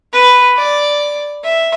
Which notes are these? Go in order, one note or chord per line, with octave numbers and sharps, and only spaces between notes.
B4
D5
E5